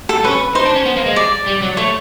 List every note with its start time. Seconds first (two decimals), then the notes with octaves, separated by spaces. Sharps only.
0.09 A4
0.24 C#4 B4
0.55 D#4 C5
0.65 D4
0.75 C#4
0.85 B3
0.96 A#3
1.05 G#3
1.16 D5
1.46 G3
1.61 F#3
1.77 A3 C#5